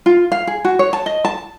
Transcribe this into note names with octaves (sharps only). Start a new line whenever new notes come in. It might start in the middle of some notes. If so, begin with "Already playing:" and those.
F4
F5
G#4
F#4
C#5
A5
D#5
A5